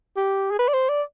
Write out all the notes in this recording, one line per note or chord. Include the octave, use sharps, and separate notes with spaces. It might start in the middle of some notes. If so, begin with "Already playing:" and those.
G4
G#4
B4
D5
C5
D5